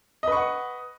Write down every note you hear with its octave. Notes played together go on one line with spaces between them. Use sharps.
B4 D#5 F#5 C#6